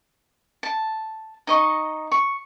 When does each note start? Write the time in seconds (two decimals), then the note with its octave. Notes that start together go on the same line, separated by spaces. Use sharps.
0.63 A5
1.47 D#4 D#5 C#6
2.12 C#6